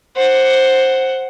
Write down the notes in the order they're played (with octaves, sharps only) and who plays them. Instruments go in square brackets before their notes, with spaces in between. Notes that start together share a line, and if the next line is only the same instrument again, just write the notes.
[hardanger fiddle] C5 F#5